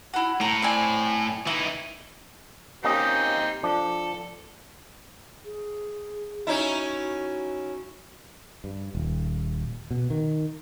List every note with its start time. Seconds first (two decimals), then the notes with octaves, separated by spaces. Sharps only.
0.14 E4 F#4
0.41 A2 A#5
0.62 C4 D5 G#5
1.47 E3 D#4 E4
2.84 A#3 C4 C#4 D#4 G4 D#5
3.63 F3 D4 A4
5.45 G#4
6.47 C#4 D#4 E4 F#4
8.64 G2
8.95 D#1
9.91 B2
10.10 D#3